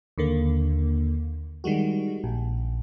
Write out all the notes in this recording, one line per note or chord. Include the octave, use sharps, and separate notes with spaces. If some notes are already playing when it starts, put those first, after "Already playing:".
D#2 D3 A#3
D#3 G3 G#3 F#4
A#1